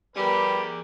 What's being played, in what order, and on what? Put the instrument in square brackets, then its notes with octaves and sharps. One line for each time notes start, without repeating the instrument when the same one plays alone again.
[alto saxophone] G3 [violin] G4 A#4 [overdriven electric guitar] G#4 D5 [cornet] B4